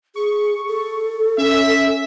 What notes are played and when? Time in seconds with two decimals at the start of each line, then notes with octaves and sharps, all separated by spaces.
0.16 G#4 C#6
0.68 A4
1.38 C#4 E5